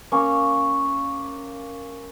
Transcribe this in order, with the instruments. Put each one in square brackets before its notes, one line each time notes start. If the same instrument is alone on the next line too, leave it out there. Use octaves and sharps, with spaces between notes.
[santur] A#3 C#4